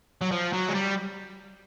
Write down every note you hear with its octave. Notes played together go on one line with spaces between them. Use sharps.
F#3
F3
F#3
G#3
G3